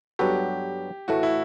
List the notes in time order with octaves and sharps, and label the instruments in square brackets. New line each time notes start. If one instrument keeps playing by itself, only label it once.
[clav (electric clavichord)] G2 F#3 B3 F#4 A4 [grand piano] G4
[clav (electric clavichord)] A2 E3 A3 [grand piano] F#4
[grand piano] E4